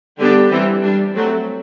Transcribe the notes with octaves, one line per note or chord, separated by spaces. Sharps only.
D3 G3 B3 D4 G4
E3 G3 C4
G3 D4
F#3 A3 C4